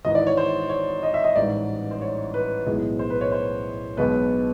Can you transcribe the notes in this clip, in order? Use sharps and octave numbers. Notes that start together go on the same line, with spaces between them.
G#1 G#2 E3 D#5
D5
C#5
C5
C#5
D#5
E5
D#5
A1 G#2 E3 G3 D5
C5
C#5
B4
B1 A2 E3 G#3 B3
C5
B4
C#5
C5
B1 B2 G#3 B3 B4